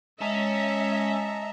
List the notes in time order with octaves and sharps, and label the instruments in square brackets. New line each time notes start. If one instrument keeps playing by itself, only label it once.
[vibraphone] G#3 [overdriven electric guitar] C#4 [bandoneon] D#5 A5 A#5 [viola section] E5